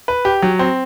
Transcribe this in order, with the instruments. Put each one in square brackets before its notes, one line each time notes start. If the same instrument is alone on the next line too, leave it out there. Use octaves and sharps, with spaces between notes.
[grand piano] B4
G4
F#3
C4